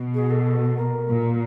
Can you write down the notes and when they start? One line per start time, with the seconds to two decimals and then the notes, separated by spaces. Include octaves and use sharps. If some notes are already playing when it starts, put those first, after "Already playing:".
Already playing: B2
0.14 G#4
0.31 A4
0.77 A#4
1.09 A#2